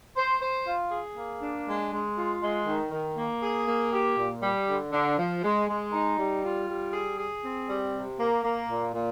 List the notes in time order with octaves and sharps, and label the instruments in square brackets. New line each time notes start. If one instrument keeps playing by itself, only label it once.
[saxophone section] C5
C5
F4
G#4
A#3
D4
G#3
G#3
F4
G#3
D#3
D#3
A#3
G#4
A#3
G4
A#2
G3
D3
D3
F3
G#3
G#3
D#4
G3
F4
G3
G#4
G#4
C4
G3
C3
A#3
A#3
A#2
A#2